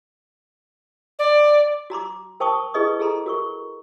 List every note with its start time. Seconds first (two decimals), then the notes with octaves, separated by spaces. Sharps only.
1.19 D5
1.90 F#4 A#5 C6 D6
2.40 A#4 C5 G5 A5 C#6 D#6
2.74 E4 G#4 B4 D#5 C#6 D#6
2.99 E4 G#4 A4 A#5 C6
3.26 F#4 A#4 C#6